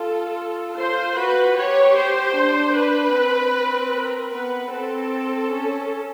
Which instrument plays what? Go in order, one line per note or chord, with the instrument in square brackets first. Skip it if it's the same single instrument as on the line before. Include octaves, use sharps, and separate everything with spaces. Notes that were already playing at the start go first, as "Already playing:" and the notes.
Already playing: [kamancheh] F4 [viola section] A4
[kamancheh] F4 [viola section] C5
[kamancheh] F#4 [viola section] B4
[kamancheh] G4 [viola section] C#5
[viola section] C5
[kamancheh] D4
[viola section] B4
[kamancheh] C4
[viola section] A#4
[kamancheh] B3 [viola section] B4
[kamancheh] C4 [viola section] A4
[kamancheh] C#4